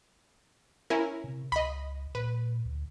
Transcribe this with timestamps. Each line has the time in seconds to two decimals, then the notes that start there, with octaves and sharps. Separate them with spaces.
0.90 C#4 E4 A#4
1.24 C3
1.52 C#2 D#5 B5
2.15 A#2 B4
2.65 D2